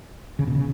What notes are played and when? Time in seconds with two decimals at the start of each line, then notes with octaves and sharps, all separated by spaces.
0.39 C#3
0.47 B2
0.55 C#3